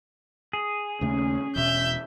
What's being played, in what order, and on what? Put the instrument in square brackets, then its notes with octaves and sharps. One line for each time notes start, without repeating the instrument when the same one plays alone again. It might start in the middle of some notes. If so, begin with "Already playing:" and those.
[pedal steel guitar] G#4
[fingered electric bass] D#2 C#3 A3 [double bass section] C#4
[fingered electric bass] E1 B2 [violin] E5 G6